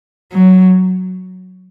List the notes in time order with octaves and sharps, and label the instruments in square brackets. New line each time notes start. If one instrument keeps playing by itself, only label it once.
[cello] F#3